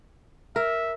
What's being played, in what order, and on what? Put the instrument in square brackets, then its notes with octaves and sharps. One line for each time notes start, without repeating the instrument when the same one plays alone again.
[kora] A#4 [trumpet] E5